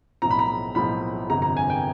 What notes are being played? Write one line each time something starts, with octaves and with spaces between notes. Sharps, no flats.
B1 A2 F3 A#5
B5
A#5
B1 A2 F3 B5
G1 F2 C3 A#5
A#5
G#5
G5